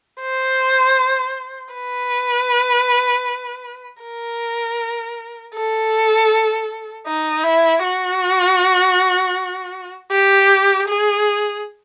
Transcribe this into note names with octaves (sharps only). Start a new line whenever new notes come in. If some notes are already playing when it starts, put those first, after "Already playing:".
C5
B4
A#4
A4
D#4
E4
F#4
G4
G#4